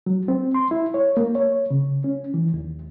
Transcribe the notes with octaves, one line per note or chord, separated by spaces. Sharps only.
F#3
C4
C6
E4
C#5
A#3
C#5
C#3
C#4
E3
D#2